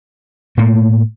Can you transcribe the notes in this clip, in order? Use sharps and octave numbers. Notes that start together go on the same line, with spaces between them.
A2 A3 A#3